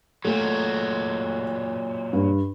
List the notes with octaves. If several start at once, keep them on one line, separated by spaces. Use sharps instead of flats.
A#2 F#3 A3
G2